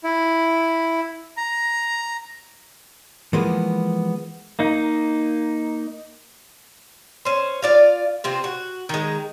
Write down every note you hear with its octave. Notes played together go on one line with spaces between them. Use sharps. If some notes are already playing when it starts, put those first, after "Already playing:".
E4
A#5
E3 F3 G#3 A#3 B3
A#3 D#4
C#4 C5
F4 D5 F5
C3 C4 F4
F#4
D#3 G#3